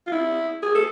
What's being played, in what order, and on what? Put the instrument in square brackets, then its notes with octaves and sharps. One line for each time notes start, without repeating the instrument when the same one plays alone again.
[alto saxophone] F4
E4
G#4
A4